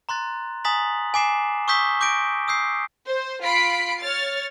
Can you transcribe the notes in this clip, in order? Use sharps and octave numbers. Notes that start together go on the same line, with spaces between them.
A#5 C6 F#6 A6
G#5 A#5 D#6 A6 B6 F#7
G#5 D6 C7 E7
C#6 D#6 E6 G6 B6 G7
C#6 D6 G6 A#6 D7
D#6 E6 G6 C7
C5
F4 B5 B6 C7 D7
C#5 F6 A6